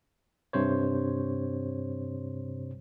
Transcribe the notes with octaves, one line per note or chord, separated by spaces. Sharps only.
G2 C3 C5 C#5